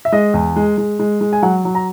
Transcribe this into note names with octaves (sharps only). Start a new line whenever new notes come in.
E5
G#3 D#5
E2
G#3
G#3
G#3
G#3
G#5
F#3 F#5
F#3
A#5